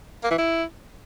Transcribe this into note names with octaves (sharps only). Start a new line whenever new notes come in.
A#3
E3
E4